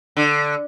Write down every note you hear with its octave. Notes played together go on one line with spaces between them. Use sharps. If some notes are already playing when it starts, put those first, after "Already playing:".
D3